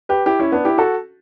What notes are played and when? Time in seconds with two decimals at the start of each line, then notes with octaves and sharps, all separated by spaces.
0.09 G4 B4
0.26 E4 G4
0.39 C#4 E4
0.52 B3 D4
0.65 E4 G4
0.78 F#4 A4